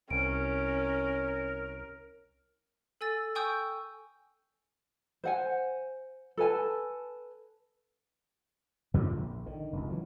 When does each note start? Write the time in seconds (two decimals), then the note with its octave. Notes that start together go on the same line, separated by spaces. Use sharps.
0.10 C2 C#4 A#4 D7
3.01 A4 G#5 E6 A6
3.35 G5 G#5 C#6 D#6 E6 G6
5.24 C5 F#5 G#5
6.37 A4 B4 G#5 A5
8.94 F2 A#2 D3 F3
9.17 A#1
9.46 D3 D#3
9.73 F1 C#2
9.90 E3 F#3